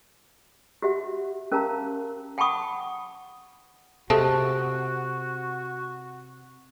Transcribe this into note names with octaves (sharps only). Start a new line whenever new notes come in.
F#4 G4 E5 F#5
C#4 A#4 F5 A5 A#5
F#5 G5 A5 B5 C#6 D#6
C3 G#3 A3 F#4 A5